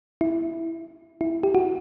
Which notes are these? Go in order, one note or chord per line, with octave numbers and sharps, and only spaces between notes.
E4
E4
G4
F#4